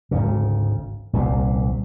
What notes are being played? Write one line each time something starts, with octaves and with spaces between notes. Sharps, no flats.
G#1 D2 C#3
D#1 C2 A#2